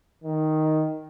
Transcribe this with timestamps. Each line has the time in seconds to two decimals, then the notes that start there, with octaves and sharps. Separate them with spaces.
0.24 D#3